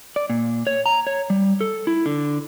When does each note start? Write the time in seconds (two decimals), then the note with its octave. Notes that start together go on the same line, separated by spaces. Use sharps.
0.16 D5
0.30 A#2
0.67 C#5
0.86 A#5
1.07 C#5
1.30 G3
1.61 A4
1.87 E4
2.06 D3